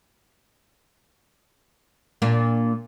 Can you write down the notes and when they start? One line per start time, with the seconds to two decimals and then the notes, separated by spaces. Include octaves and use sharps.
2.22 A#2 A#3 D4